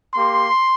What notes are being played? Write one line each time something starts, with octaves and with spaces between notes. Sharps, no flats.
A#3 G4 C6